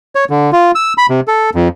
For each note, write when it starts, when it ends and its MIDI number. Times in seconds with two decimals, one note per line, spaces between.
0.15 0.25 73
0.30 0.51 50
0.52 0.71 65
0.75 0.93 88
0.98 1.06 83
1.10 1.21 48
1.28 1.50 69
1.55 1.68 41